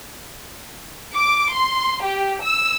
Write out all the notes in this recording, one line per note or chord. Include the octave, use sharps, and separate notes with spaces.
D6
C6
G4
E6